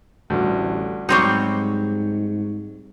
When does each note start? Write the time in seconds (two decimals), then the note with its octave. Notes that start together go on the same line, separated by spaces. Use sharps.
0.30 A1 D2 G2
1.09 G#2 F#3 G3 C4 D#4 C#6